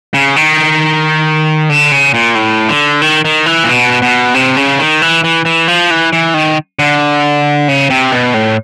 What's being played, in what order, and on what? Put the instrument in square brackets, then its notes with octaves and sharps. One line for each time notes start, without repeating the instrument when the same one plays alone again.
[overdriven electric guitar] C#3
D#3
D3
C#3
A#2
A2
D3
D#3
D#3
E3
A#2
B2
B2
C3
C#3
D#3
E3
E3
E3
F3
E3
E3
D#3
D3
C#3
C3
B2
A2